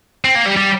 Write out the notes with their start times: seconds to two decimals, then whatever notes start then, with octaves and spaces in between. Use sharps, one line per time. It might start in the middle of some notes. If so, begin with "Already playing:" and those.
0.25 C4
0.35 A#3
0.46 G3
0.57 G3